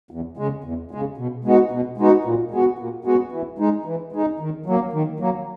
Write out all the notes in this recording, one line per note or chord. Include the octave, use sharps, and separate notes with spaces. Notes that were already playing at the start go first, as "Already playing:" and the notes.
E2
C#3 G#3
E2
C#3 G#3
B2
G#3 B3 D#4 F#4
B2
G#3 B3 D#4 F#4
A#2
G#3 B3 F#4
A#2
G#3 B3 F#4
E3
G#3 D#4
E3
G#3 D#4
D#3
F#3 A#3
D#3
F#3 A#3